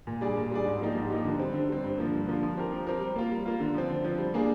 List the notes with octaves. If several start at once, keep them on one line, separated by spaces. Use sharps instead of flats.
A#2
G3 D4 G#4 D5
A#2
G3 D4 G#4 D5
G#2
F3 A#3 D#4 G4
G#2
F3 A#3 D#4 G4
D3
G3 C4
D3
G3 C4
G2
D3 F3 A#3
G2
D3 F3 A#3
F3
C4 G4 A#4
F3
C4 G4 A#4
G3
A#3 F4
G3
A#3 F4
D3
F3 C4
D3
F3 C4
G3
A#3 D4 G#4